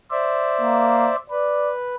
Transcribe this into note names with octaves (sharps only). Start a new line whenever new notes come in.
C5 D5 E5
A#3
B4 D5